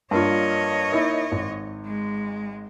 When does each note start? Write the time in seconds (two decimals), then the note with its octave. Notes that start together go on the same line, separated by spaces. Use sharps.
0.11 G2 A#3 F4 C#5 D#5
0.92 A#3 D#4 E4
1.32 G#1
1.86 G#3